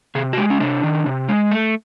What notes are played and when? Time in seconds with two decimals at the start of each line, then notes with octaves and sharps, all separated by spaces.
0.15 C3 G#4
0.33 F#4
0.38 G#3 G4
0.50 C#4
0.60 C3 D4
0.83 D#3
1.06 C3
1.29 G#3
1.51 A3